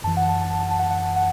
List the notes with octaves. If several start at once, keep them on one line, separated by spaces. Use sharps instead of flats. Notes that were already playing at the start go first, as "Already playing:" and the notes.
F#2 E3 A5
F#5
A5
A5
A5
A5
F#5
F#5
F#5
F#5